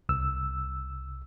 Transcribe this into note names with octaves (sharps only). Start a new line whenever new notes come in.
C2 E6